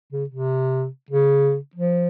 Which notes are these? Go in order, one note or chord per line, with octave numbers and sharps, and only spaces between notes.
C#3
C3
C#3
F3